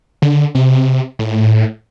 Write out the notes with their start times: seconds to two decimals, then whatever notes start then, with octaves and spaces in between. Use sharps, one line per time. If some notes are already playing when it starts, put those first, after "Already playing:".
0.22 D3
0.55 C3
1.19 A2